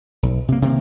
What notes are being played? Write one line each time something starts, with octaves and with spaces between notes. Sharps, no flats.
B1
C3 A#3
C3 D#3 F3 A#3